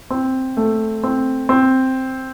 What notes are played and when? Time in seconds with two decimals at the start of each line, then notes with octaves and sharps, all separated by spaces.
0.10 C4
0.57 A3
1.03 C4
1.49 C4